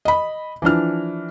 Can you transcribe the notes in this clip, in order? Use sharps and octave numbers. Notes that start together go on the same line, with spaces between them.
D#5 B5
E3 F3 D4 F6